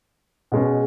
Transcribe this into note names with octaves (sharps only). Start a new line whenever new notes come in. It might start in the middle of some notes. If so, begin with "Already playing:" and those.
B2 G#3 C#4